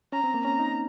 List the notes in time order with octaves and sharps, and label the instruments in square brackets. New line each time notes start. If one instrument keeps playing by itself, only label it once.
[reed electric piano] C#4 [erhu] A#5
[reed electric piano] C4
A#3
[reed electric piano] C#4 [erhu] A#5
[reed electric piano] D#4